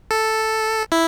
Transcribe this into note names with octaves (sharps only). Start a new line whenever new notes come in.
A4
E4